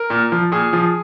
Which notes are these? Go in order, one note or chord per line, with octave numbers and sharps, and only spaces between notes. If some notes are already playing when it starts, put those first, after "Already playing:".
Already playing: A#4
A#2
F3
A#2 G#4
F3